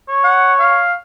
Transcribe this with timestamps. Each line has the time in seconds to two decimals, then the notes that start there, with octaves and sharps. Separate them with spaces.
0.09 C#5
0.24 F#5
0.60 F5